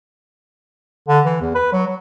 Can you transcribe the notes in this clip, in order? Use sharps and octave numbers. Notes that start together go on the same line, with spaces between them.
D3
E3
E2
B4
F#3
F#3